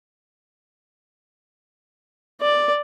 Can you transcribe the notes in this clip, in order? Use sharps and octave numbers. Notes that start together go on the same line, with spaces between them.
D5